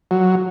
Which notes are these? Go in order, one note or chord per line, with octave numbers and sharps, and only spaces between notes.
F#3